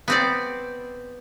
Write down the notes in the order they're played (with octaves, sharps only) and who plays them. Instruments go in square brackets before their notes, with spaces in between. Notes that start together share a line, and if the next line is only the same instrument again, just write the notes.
[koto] B3 C4 D5